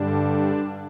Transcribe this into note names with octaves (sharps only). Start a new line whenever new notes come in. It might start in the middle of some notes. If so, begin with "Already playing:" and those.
Already playing: G2 D3 G3 D4